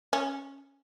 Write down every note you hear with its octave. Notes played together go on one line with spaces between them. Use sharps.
C#4